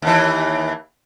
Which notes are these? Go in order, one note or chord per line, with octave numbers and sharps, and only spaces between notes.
D#2 E3